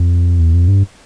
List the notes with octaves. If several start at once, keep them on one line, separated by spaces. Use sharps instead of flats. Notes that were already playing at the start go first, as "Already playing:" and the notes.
Already playing: F2
E2
F2
G2